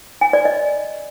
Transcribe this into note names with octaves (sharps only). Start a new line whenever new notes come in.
G#5
D5
D#5